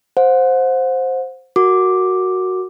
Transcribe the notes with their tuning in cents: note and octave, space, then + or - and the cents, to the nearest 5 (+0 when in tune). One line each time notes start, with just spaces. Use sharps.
C5 +0 F#5 -35
F#4 +0 A#4 -10 D6 +0